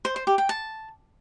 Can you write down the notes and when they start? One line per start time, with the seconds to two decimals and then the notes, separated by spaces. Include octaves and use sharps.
0.05 C5
0.16 C5
0.27 G4
0.38 G5
0.49 A5